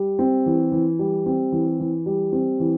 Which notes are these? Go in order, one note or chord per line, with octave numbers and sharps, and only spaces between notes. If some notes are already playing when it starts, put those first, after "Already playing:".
Already playing: G3
C4
E3
E3
G3
C4
E3
E3
G3
C4
E3